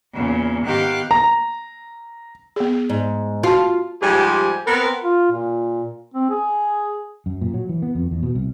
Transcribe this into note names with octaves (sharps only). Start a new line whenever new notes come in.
E2 A#2 C#3
G#2 D#3 B3 G4 F5 F#6
A#5
B3 G#4
G#2
F4 F#4 A5
G#2 F3 G3 G4 G#5
B3 C4 A#4
F4
A#2
C4
G#4
F#2
A#2
F#3
E3
B3
F2
E2
B2
C2